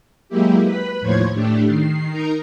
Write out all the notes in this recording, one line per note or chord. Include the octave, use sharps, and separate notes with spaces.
F#3 G#3 A#3 E4 G4
B4 B5
D#2 A2 F3 C5 C#5 G#6
A2 A3 D4 G4
D#3 C7
D#4 A#4 A#5